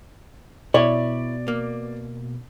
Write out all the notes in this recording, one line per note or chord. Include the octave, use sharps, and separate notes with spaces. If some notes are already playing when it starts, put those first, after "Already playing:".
B2 E4 C#5 D5
A#3